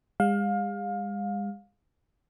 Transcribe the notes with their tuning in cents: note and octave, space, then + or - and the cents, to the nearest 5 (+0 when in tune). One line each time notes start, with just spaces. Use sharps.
G#3 -40 F5 +25